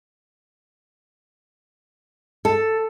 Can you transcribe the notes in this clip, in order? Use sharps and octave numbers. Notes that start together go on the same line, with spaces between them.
A4